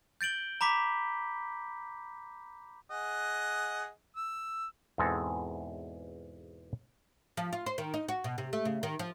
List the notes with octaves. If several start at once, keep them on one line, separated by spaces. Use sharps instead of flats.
G6 A6 D7 F#7 G7
A#5 B5 D6 B6
G#4 D#5 F#5
E6
E2 G#2 B2 G#3 C4 A4
F3
F4
C5
D#3
D#4
F#4
B2
C3
A3
C#3
D#3
F3